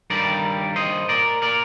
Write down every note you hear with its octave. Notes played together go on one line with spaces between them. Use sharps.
G2 D#3 G3 A#4 D5
C5 D#5
A#4 D5
A#4 D5